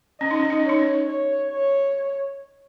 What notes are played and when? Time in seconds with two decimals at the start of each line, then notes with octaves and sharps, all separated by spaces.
0.21 C#4 D#5
0.31 D#4
0.40 C#4
0.50 D#4
0.59 C#4 C#5
0.69 D#4
0.79 C#4
1.07 C#5
1.50 C#5